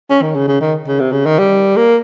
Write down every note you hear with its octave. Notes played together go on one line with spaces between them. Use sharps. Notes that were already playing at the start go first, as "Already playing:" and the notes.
C#4
D#3
C#3
C#3
D#3
C#3
C3
C#3
D#3
G3
A#3